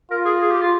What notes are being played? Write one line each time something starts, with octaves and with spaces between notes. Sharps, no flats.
F4 A#4
G#4
G#4
G4
F4